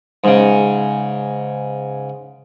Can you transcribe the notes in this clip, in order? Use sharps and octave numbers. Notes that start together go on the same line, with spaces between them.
G#2 C#3